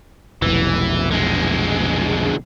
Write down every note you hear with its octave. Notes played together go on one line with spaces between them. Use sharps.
F1 B1 E3
D3 G#3